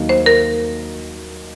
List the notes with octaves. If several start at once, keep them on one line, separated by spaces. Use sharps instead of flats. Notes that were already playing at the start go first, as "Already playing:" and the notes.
Already playing: D#2 D#3 F#3 A#3 D#4
C5
A#4